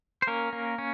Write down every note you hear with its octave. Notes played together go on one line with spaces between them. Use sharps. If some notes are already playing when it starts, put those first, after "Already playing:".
C5
A#3 C#4 A#4
A#3
C#4